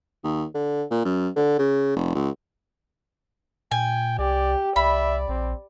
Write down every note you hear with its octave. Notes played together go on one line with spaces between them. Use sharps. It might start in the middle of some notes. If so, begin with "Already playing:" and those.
D#2
D3
A#2
F#2
D3
C#3
F1
C#2
A#2 G5 G#5
C2 G4 D5
C2 D5 E5 B5
A#1 C4